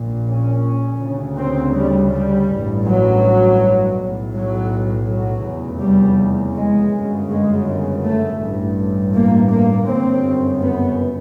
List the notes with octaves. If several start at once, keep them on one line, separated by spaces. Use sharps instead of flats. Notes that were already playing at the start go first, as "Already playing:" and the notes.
Already playing: A#1 A#2
C#4
D2 C#3
C4
G3
G3
A1 G2
F#3
B1 A2
F#3
F#3
F1 E2 C#3
G3
G#3
G1 F#2 C#3
G#3
A3
A1 G2
A#3
A#3
G1 F#2 C#3 C4
B3